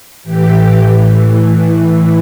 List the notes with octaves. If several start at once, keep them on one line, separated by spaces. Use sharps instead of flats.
A2 E3 G4